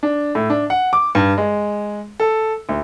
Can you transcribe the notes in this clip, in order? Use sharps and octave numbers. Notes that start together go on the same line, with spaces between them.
D4
A2
D4
F#5
D6
G2
G#3
A4
D2